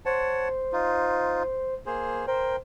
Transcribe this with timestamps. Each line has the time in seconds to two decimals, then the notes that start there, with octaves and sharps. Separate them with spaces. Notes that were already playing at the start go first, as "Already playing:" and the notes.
0.06 C5 C#5 F#5 A5
0.73 D#4 F4
1.86 A#3 G#4 C5
2.27 A#4 C5 G5